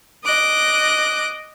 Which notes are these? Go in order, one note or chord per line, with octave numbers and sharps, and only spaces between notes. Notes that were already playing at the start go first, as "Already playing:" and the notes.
D#5 D6 F#6